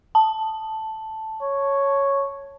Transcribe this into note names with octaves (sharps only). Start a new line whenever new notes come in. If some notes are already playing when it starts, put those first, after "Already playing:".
A5
C#5